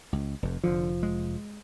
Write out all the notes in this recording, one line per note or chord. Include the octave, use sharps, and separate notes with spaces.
C#2
F1 F2
F1 D3 F3
G#3